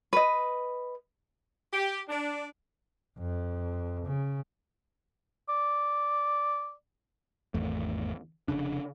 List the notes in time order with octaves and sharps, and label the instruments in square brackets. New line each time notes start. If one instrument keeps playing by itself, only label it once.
[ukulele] B4 D#5
[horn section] G4
D4
[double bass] F2
C#3
[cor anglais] D5
[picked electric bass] G#1 E2 A3
F1 C#2 C#3 D4